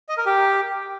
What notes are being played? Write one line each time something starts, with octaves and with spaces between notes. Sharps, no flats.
D#5
A#4
G4